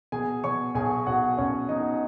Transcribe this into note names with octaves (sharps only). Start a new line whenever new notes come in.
B2 G#4 G#5
B2 C#5 C#6
B1 G#4 G#5
B1 F#4 F#5
B1 C#4 C#5
B2 D#4 D#5